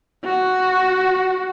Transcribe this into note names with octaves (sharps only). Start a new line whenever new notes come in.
F#4